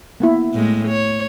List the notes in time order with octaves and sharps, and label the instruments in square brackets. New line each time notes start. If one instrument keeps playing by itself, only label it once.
[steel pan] A#3 B3 E4
[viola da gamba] A2 G#3
C#5